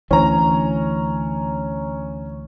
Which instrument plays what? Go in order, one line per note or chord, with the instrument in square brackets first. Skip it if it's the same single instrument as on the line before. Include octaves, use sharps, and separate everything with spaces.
[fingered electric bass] D2 E3 [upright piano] C#4 A#5